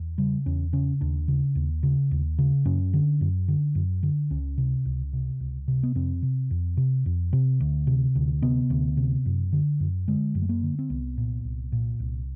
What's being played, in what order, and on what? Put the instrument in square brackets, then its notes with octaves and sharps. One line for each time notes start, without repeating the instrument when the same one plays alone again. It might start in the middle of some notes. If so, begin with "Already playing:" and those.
Already playing: [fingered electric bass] E2
C#3 G3
E2 C#4
C#3 C#4
D#2 D4
C#3
D#2
C#3
D#2
C#3
F#2 C#4
D3
F#2
D3
F#2
D3
C#2 C#4
C3
C#2
C3
C#2
C3
B3
F2 C4
C3
F2
C3
F2
C3
D2
C3
D2
C3 B3
D2
C3
F#2
D3
F#2
D3 G#3
F#2
A3
A#3
D3
C4
C2 B3
A#2
C2
A#2
C2